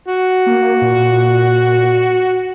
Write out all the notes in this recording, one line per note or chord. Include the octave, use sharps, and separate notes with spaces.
F#4
A#3
A#2